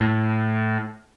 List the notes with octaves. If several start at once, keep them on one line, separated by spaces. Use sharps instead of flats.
A2